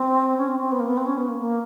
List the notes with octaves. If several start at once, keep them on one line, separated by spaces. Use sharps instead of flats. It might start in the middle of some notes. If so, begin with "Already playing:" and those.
Already playing: C4
C#4
C4
C4
B3
A#3
B3
C4
C#4
B3
A#3
A#3